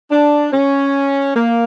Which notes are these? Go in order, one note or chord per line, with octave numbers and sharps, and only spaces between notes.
D4
C#4
A#3